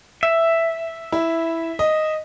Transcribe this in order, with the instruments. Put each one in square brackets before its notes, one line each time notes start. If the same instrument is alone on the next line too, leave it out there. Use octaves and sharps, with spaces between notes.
[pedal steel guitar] E5
[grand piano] E4
D#5